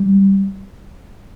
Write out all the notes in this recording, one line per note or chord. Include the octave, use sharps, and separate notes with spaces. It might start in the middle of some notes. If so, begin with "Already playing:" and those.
Already playing: G3